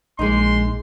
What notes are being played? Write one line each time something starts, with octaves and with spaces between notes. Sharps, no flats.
A#1 G#3 A#3 D#4 C6